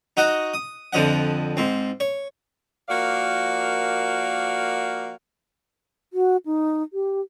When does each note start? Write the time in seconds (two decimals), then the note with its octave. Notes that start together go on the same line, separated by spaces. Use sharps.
0.17 D#4 F#4 D#5 F#5
0.54 D#6
0.93 F2 D3 F3 D#5 F#5
1.57 G#2 C4
2.00 C#5
2.89 F3 A#3 F#4 A#4 D5 F5
6.13 F#4
6.45 D#4
6.93 G4